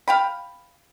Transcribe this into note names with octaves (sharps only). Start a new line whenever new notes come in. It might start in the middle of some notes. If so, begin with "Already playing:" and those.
F5 G5 B5